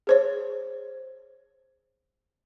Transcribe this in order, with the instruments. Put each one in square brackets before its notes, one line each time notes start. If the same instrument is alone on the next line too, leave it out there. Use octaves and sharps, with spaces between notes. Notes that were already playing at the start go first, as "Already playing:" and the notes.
[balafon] G#4 C5 C#5